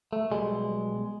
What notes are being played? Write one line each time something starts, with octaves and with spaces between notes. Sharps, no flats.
A3
B1 B2 G3 G#3